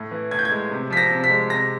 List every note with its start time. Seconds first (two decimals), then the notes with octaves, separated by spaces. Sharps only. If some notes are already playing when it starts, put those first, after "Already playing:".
Already playing: A2
0.11 E3
0.31 A2 G#6
0.39 G6
0.45 G#6
0.51 G#3
0.71 C3
0.90 F3 B6
0.97 A#6
1.11 C3
1.24 B6
1.30 G#3
1.50 C3 A#6